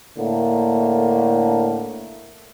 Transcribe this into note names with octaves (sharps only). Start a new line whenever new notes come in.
A2 D3 A3 A#3